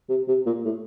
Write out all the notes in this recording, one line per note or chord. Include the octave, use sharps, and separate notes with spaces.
C3
C3
A#2
A2